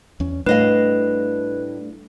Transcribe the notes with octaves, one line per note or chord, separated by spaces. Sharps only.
E2 C#4
A2 G3 A3 D4 B4 D#5 F5